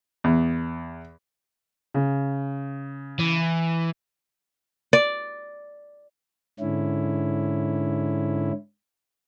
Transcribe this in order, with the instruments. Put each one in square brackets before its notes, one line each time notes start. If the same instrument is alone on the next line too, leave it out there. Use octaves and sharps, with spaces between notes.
[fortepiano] E2
[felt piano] C#3
[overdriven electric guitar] E3
[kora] D5
[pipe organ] G#2 D3 C#4 E4